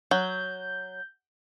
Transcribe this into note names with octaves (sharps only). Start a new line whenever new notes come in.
F#3 G6